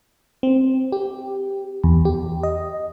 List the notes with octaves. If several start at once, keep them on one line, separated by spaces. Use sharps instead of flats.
C4
G4
E2
G4
D#5